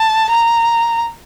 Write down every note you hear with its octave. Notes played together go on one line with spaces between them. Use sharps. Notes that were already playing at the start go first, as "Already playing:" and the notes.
Already playing: A5
A#5